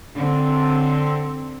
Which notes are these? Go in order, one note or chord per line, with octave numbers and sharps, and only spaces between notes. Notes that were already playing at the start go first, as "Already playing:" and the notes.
D3 C4